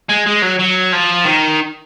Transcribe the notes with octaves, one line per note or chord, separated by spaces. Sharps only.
G#3
G#3
F#3
F#3
F3
D#3